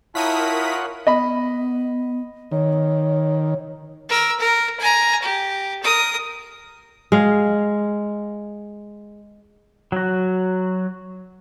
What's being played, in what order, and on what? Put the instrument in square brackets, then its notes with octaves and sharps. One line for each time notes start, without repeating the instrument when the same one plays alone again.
[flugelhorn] E4 [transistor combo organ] F4 C#5 F#5 [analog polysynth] A#4 D#6 B6 [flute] A5
[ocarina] B3 [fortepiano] D#5 B5
[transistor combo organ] D#3 [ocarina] C#5
[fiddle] A#4 E6
A#4
G#5 A#5
G4
A#4 D#6
[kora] G#3 F5
[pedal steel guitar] F#3 F#4